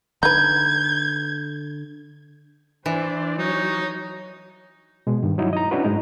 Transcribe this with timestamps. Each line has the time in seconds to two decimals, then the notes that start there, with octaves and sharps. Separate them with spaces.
0.23 D3 D#4 B4 G6 G#6
2.86 E3 D4 E4 C5
3.38 F#3 D#4 C#5
5.07 B2 G#3
5.23 G2 D#3
5.38 F#3 D#4 E4
5.53 D#5 A#5
5.71 C#4 D4 E4 F#4 B4
5.85 G#2 G#3 D#4